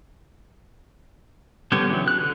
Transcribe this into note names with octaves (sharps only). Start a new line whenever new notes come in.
D3 G3 B3 G4 C#5
C#3 E3 F#3
F#6
D3